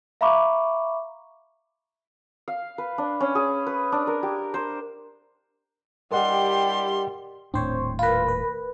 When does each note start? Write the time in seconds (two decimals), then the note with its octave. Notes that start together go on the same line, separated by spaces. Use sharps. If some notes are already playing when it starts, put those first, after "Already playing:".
0.21 E5 F5 A#5 B5 C#6 D6
2.48 F5
2.78 B4
2.98 D4
3.20 C#4
3.35 G#4
3.67 B4
3.92 D4
4.07 A#4
4.23 G4
4.54 C5
6.12 G3 D4 E4 G4 A#4 D#5 F#5 C6
7.54 D#1 A2 C4 D4 C5 C#5
7.99 F4 A#4 B4 B5
8.28 B4